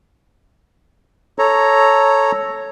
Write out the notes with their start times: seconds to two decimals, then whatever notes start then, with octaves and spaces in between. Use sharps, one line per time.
1.39 A4 C#5 A#5